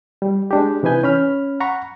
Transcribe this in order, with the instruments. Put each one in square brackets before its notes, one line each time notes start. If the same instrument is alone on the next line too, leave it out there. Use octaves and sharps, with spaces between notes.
[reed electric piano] G3
G#3 D4 G4
C3 E3 D#4 B4 G#5 G6
C#4 B5 F6
F#5 A#5 B5 C#6